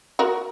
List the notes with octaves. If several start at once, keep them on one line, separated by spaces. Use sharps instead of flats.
F#4 A#4